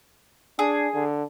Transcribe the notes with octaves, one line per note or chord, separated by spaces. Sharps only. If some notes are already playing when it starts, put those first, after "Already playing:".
D4 G#4
D3